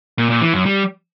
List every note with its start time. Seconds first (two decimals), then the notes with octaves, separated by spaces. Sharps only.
0.18 A#2
0.30 A#2
0.42 E3
0.54 F#2
0.66 G3